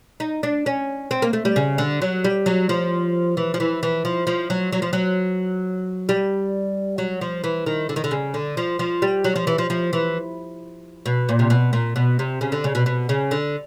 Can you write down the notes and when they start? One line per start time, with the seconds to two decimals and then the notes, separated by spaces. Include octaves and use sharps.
0.20 D#4
0.43 D4
0.66 C#4
1.11 C4
1.22 A#3
1.33 A3
1.45 G3
1.56 C#3
1.78 D3
2.02 F#3
2.24 G3
2.46 F#3
2.69 F3
3.37 E3
3.54 F3
3.60 E3
3.83 E3
4.05 F3
4.27 F3
4.50 F#3
4.72 F#3
4.82 F3
4.93 F#3
6.09 G3
6.98 F#3
7.21 F3
7.44 E3
7.66 D#3
7.89 D3
7.96 D#3
8.04 D3
8.11 C#3
8.34 D3
8.57 F3
8.79 F3
9.02 G3
9.24 F#3
9.36 F3
9.47 E3
9.58 F3
9.70 F3
9.93 E3
11.06 B2
11.29 A#2
11.39 C3
11.50 B2
11.73 A#2
11.96 B2
12.19 C3
12.41 C#3
12.52 D3
12.64 C#3
12.75 B2
12.86 B2
13.09 C#3
13.31 D3